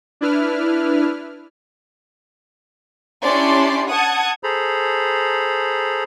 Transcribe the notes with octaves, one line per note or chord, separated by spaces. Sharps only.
D4 E4 B4 F6
C#4 D4 E4 G4 D5 C6
F#5 A5 D#6 G#6
G#4 A4 C5 A#5 B5